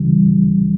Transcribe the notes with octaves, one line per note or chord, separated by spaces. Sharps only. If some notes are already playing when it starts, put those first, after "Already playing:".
Already playing: C#2 C#3 E3 G3